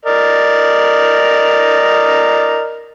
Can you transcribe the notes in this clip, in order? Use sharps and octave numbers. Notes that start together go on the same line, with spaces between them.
A#4 D5 D#5